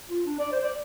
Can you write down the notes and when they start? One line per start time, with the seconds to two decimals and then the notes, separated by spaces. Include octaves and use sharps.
0.09 F4
0.26 D4
0.39 D5
0.52 C5
0.64 D5